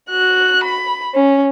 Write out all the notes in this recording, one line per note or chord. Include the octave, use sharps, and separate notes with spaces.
F#4 F#6
B5
C#4